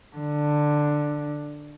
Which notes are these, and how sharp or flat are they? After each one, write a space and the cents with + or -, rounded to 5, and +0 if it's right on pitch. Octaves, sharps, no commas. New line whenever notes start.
D3 +10